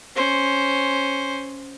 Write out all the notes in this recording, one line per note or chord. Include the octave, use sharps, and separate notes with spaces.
C#4 C5